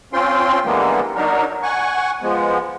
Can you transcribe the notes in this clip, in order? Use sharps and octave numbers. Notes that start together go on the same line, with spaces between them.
C4 C#4 F4 G5 C6
D3 E3 G3 G#3 A#3 B3
F#3 D4 D#4 A#4
F#5 G#5 C#6
F3 G#3 B3